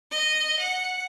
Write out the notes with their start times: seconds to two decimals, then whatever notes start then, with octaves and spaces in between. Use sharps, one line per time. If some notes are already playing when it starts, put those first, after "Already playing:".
0.12 D#5
0.59 F#5